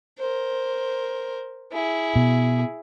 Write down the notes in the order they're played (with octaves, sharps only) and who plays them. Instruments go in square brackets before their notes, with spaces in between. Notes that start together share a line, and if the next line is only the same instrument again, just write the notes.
[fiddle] A#4 C5
E4 G#4
[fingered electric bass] B2